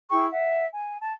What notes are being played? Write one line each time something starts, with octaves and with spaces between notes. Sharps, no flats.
E4 G#4 G5 C#6
E5 F#5
G#5
A5